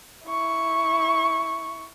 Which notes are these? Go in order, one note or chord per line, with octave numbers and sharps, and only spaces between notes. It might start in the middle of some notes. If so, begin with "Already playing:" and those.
E4 C#6